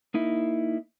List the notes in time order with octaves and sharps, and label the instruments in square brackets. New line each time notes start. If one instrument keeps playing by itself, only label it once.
[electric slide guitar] A#3 D#4 E4